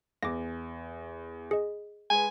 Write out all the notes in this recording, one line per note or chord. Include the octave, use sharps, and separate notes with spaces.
E2 D6 A#6
G#4 D#5
G#3 B4 G#5